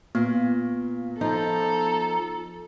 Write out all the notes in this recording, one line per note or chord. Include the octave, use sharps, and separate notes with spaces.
A#2 B3
F3 D#4 A4 A#5